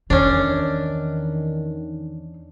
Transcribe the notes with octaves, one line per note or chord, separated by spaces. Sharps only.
E2 D#3 C#4 D4